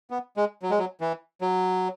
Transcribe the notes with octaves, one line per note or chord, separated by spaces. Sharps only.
B3
G#3
F#3
G#3
F#3
E3
F#3